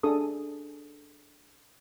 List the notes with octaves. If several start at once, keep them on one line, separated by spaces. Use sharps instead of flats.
D4 G#4 A4 D#6